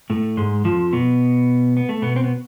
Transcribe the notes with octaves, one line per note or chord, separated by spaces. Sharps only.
A2 A3
G#2 G#3
F2 F3
B2 B3
B3
A3
B2 B3
C4
B3